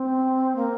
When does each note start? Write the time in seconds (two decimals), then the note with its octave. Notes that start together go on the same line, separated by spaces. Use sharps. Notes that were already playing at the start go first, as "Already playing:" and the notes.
Already playing: C4
0.56 A#3